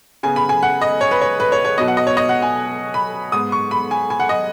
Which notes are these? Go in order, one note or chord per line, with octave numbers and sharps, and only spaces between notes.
C#3 B3 G#5
B5
G#5
F#5
D#5
C#5
B4
C#5
B4
C#5
C#5
B2 F#3 B3 D#5
F#5
D#5
C#5
D#5
F#5
G#5
B5
G#2 G#3 B3 D#6
C#6
B5
G#5
G#5
F#5
D#5